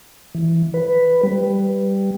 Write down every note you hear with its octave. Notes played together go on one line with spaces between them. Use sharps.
E3
B4
G3